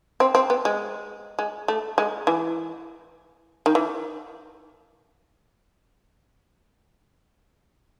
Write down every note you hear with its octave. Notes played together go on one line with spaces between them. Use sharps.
C4
C4
B3
G#3
G#3
A3
G#3
E3
D#3
E3